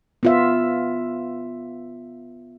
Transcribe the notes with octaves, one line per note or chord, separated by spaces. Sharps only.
B3 F4 E5